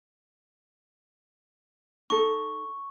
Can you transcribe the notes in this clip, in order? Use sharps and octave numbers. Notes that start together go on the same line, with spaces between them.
D#4 A4 C#6